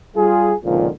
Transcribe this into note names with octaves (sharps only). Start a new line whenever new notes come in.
G3 F4 G#4
C#2 A#2 D3 D#3 F3